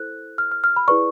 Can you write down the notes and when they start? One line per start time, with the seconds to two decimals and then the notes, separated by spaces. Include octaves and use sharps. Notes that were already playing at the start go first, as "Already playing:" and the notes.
Already playing: E4 A4 C5 F#6
0.38 F6
0.52 F6
0.64 F6
0.76 B5
0.88 E4 G#4 B4 D5 C#6